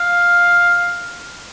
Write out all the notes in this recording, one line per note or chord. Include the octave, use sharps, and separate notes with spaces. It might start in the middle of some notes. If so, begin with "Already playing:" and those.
Already playing: F5